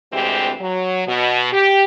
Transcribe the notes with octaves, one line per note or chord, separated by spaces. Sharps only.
D2 C3 E3 G#3 C4 G4
F#3
B2
G4